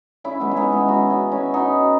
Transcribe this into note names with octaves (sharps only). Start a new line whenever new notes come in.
C#4 E4
G#3 B3
E4
B3 D#4
C#4 E4
D#4 F#4
C#4 E4
C#4 E4
D#4 F#4